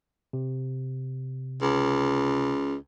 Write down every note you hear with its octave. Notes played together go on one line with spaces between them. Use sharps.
C3
C#2